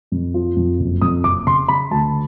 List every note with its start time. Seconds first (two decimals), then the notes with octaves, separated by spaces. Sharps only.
0.12 F2
0.34 F3
0.56 F2
0.80 F#1
1.02 F2 D#6
1.24 F#1 D6
1.46 C#3 C6
1.68 C#3 B5
1.91 D2 A5